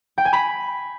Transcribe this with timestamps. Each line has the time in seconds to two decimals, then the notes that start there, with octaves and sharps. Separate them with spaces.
0.18 G5
0.25 G#5
0.33 B5